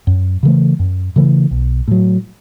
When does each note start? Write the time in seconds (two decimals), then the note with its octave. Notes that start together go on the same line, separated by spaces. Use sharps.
0.07 F#2
0.43 C#3 E3 A3
0.79 F#2
1.16 C#3 E3 A3
1.51 B1
1.88 A2 F#3